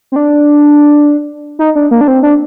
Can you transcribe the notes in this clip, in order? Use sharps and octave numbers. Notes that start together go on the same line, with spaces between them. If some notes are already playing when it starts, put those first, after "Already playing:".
C4
D4
D#4
D4
A#3
D4
C4
D4